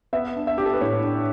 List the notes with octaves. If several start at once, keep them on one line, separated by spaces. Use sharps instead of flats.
B3 E5
D4
E5
D4 G4
A4
B4
A2 C#5
D4